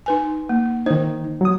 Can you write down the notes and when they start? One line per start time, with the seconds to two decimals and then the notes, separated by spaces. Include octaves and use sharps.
0.06 D#4 B4 G#5
0.49 A#3
0.86 D#3 D#4 C5
1.41 F#3 D#6